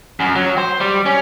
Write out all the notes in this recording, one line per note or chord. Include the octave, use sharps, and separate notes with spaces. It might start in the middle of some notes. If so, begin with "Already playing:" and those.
F#2
F#3
C5
G3
C#4